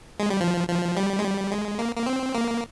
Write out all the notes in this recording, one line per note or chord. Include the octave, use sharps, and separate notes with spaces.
G#3
G3
F3
F3
G3
G#3
G3
G#3
A#3
A#3
C4
A#3